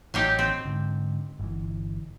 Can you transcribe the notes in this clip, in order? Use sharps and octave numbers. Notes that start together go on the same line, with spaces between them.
A1 F#3 D#4 G4
C4
G#2 D3
G1 E3